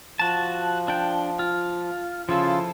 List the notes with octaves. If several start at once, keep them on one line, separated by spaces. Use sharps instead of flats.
F3 F#4 A5
D4 G5
F4
C#3 F3 E4 F4 A4